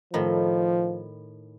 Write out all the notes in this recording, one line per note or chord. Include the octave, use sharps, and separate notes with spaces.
A2 D#3 F3